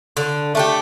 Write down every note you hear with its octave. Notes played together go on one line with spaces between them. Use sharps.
D3
A3 D4 G4